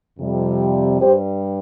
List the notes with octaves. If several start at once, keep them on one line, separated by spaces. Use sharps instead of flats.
F2 C3 G3
G2 G3 G4 C5